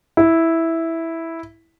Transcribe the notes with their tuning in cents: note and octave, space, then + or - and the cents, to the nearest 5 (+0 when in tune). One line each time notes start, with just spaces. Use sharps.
E4 -5